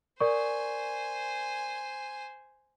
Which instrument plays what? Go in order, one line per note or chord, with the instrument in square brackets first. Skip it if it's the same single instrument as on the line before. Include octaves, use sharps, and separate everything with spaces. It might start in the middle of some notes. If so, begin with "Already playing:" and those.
[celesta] A#4 D5 C#6 [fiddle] C5 G#5